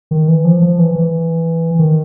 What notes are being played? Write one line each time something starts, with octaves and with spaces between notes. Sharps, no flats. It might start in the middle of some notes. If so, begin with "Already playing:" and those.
D#3
E3
F3
F3
E3
E3
D#3